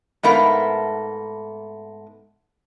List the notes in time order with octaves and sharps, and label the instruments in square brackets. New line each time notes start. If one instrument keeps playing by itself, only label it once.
[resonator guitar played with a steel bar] G#2 A3 B3 A#4 F5